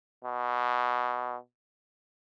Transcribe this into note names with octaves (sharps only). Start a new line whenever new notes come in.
B2